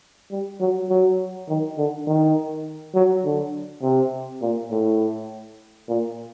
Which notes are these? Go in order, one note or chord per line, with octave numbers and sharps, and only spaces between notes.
G3
F#3
F#3
D#3
D3
D#3
F#3
D3
C3
A#2
A2
A#2